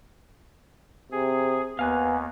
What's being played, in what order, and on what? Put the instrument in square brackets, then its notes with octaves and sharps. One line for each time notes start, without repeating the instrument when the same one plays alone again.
[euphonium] C3 [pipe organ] G#4
[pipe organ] D#2 [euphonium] B3 [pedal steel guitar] F5 G#5 F#6